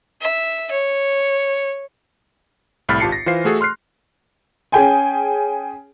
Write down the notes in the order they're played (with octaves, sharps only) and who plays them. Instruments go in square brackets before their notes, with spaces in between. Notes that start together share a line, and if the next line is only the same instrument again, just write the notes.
[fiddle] E5
C#5
[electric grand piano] C2 A2 B5 F6 A6 B6
G#1 F4 G4 A5 C7 C#7
A#6
E3 F4 C5 F5 C7
A3 F#4 G#4 A4
C6 F6 F#6 C7
[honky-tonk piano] C#4 G#4 G5 G#5